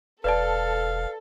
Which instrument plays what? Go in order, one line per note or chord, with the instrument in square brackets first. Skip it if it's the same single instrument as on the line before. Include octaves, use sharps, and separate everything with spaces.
[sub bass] E1 [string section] A4 [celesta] B4 D5 A5 [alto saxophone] F5